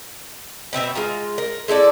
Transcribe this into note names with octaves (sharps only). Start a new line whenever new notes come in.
B2 C4 E5 A#5
G#3 F4 A#5
A#4
G#3 E4 A4 D5